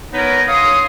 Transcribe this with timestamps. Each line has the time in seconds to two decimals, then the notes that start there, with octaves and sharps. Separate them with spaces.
0.13 B3 D#4 A#4 B4 C#5
0.48 C#5 F5 C6 D#6